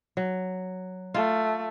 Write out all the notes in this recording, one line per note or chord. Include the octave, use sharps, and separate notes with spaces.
F#3
A3 F4